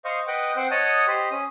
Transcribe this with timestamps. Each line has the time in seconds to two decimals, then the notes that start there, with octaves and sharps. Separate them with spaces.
0.05 C5 D#5 F5 C#6
0.28 B4 D#5 F#5 G5
0.56 C4 C5 F#5 G5
0.71 C#5 D#5 F#5 A5 D#6
1.08 G4 C5 D#5 B5
1.31 C#4 D#6